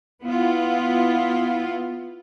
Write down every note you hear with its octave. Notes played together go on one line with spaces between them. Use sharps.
B3 E4 F4